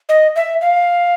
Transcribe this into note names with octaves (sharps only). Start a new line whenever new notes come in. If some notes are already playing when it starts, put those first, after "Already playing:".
D#5
E5
F5